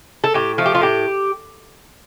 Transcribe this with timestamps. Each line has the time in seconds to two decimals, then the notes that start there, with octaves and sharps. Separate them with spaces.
0.24 A4
0.34 A2 G4
0.58 F3 A3
0.66 G4
0.75 F4
0.81 A2 G4